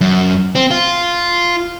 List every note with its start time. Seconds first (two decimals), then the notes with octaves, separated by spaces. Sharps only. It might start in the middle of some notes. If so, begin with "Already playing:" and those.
0.01 F#2
0.55 C4
0.71 F4